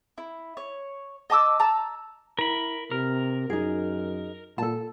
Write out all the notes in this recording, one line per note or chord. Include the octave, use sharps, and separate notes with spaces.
E4
C#5
D#5 A5 D6 E6
A5 A#5 E6
E4 A#4 B5
C3 A#4
F#2 D#4 G#4
A#2 A4 A5